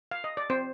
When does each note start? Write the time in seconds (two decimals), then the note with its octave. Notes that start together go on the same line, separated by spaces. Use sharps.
0.11 F5
0.24 D#5
0.37 D5
0.50 C4 C5